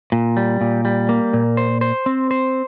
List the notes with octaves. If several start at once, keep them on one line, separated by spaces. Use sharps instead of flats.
A#2
G3
A#2
G3
A#3
A#2
C5
C5
C4
C5